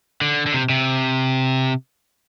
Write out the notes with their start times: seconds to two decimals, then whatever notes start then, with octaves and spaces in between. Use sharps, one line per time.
0.21 D3
0.46 D3
0.54 C3
0.69 C3